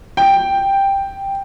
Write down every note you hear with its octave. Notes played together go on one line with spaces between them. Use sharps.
G5